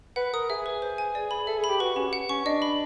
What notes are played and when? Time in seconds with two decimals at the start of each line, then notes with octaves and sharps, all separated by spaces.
0.16 B4 F#5
0.33 A#4 D#6
0.49 G#4 E5
0.66 B4
0.82 C5
0.98 G#5
1.15 D5
1.31 B5
1.47 A4 E5
1.57 G#4
1.64 B5
1.69 G4
1.80 F#4 B4
1.96 C#4 G4
2.13 F#5
2.29 C#4 C#6
2.45 D4 D#5
2.62 B5